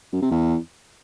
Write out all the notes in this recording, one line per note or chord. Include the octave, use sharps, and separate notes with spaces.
F#2
C3
E2